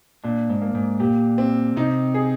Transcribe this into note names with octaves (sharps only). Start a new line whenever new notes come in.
A#2 D4
G#2
A#3
G#2
A#2 G4
C4
C3 D#4
G#4